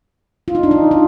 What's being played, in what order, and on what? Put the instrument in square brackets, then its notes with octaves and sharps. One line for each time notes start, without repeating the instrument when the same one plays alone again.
[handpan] F4
D#4
D4
D#4
F4